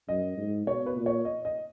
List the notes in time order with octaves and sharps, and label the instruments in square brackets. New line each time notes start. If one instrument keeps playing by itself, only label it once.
[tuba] F#2 [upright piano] D#5
[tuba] G#2
[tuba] B2 [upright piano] C#5
[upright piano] B4
[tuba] A#2
[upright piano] C#5
D#5
D#5